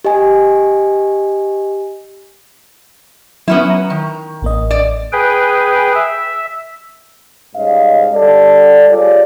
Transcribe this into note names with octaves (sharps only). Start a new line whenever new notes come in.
G4 D#5 G#5
F#3 B3 C#4 E4
A#5
D#3
A1 A#3 D#5
D5
G#4 B4 G5
E5
G#2 G3 C#4 D#5 F5
G3 A4 D5
F4 G4 G#4 C#5 D5